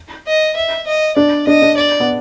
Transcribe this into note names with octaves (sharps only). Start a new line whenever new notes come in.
D#5
E5
D#5
D4 D5
D4 D#5
D4
D5
B3